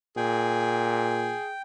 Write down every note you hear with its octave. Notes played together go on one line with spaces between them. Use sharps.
A#2 G#4 G5